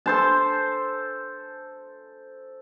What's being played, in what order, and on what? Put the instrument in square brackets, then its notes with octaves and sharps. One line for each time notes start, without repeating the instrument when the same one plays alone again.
[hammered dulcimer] A4 C5 A5